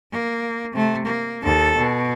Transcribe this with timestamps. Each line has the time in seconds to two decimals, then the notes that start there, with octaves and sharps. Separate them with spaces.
0.12 A#3
0.73 C3 A3
1.06 A#3
1.44 D#2 A4
1.78 B2